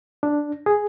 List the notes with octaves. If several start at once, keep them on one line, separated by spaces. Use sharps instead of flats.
D4
G#4